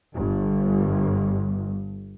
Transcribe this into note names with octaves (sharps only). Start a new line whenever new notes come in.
G1 G2